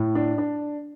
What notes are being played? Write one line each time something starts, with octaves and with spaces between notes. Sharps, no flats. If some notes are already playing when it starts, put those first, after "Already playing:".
Already playing: A2
D4
D4